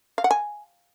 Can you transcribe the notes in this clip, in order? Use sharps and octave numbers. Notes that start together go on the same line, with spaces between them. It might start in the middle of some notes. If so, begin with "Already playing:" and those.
F5
F#5
G#5